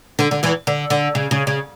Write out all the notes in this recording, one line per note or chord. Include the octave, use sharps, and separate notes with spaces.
D3
D3
E2 E3
D3
D3
C#3
C#3
C#3